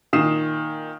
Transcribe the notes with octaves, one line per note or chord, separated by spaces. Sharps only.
A#2 D#3 D#6 C7 E7